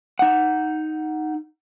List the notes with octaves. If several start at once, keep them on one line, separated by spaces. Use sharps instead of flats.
D#4 F#5